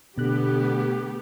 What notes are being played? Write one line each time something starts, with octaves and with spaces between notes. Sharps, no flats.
B2 D3 A3 B3 G4 F#6